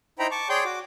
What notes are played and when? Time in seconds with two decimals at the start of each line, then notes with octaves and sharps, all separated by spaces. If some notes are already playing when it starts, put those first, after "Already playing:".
0.19 D#4 E4 C5 G5 A#5 B5
0.31 A5 C#6 D6
0.49 G#4 C#5 D5 G5 C6 G6
0.65 F#4 D6